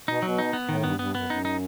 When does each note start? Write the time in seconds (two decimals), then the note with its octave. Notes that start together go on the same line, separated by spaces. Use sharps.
0.08 B2 D#4
0.22 B2 F#3
0.38 D#4
0.53 B3
0.69 A2 D#3
0.83 G2 B3
0.99 G2 B3
1.14 F#2 B3
1.30 F#2 D#4
1.45 D#4